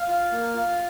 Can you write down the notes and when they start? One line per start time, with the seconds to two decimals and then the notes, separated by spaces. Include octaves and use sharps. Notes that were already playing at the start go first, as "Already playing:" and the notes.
Already playing: F5
0.08 F4
0.32 A#3
0.55 F4